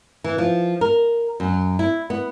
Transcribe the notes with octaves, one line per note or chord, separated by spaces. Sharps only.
E3
F3
A#4
F#2
E4
B3